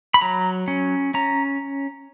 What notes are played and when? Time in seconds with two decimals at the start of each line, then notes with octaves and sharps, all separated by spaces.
0.14 B5
0.21 F#3 A#5
0.68 C#4
1.14 C#4 A#5